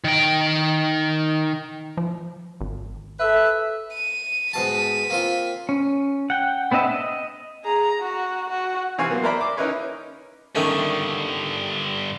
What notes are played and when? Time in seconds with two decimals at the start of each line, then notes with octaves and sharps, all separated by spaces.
0.04 D#3 G5
1.97 F3
2.61 G#1
3.20 A4 B4 E5
3.93 D#7
4.53 G#2 B2 A5 B6 D#7
5.10 A#3 C4 F4
5.69 C#4
6.30 F#5 G5
6.71 B3 C4 D4 D#5 E5
6.94 D#5
7.64 G#4 A#5
8.00 F#4
8.50 F#4
8.98 C3 E3 C4 F5 G#5 C#6
9.10 F#3 A#3 B3
9.24 A#4 C5 D5 E5 A#5 B5
9.41 D6
9.57 C#4 D#4 E4 A#4 B4 C#5
10.55 G2 D3 D#3 A3 C#4